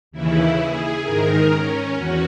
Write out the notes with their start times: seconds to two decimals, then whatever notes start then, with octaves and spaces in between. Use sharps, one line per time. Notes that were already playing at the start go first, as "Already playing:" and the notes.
0.11 D#2 C#3 E3 E4
0.58 G#4
1.03 G#2 D#3 A#4
1.49 C#4
1.95 E2 F#4